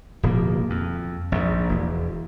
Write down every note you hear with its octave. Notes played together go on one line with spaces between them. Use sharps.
D1 B2 F3 A#3
F2
A#1 G#2
E1